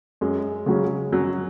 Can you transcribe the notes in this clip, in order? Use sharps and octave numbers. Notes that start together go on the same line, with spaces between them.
F#2 G#3
C#3 F#3 G#3 C#4
F#2 F#3